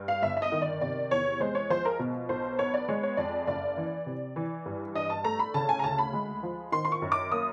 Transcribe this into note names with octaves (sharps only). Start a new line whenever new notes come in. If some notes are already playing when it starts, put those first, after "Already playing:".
Already playing: G2
F5
G1 E5
E5
D#5
D#3
D5
C3 D5
E2 C#5
G#3 C5
C#5
F3 C5
A#4
B2
B1 C5
B3 C#5
D5
G#3 C#5
C#5
F2 D5
F#1 D5
E3
C3
E3
G2
D4 D#5
A5
A3 A#5
B5
C#3 A5
G#5
A#5
D2 A5
B5
G#3
F3
D#3 C6
C6
C#6
F#2
D6
A#3 D#6